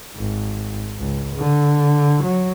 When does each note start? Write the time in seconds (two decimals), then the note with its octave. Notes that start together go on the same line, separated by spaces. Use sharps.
0.16 G#1
0.99 C#2
1.36 D3
2.23 F#3